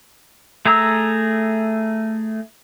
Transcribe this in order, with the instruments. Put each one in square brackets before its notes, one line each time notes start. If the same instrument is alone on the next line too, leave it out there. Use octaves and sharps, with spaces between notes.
[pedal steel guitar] A3 G#4 A#5 E6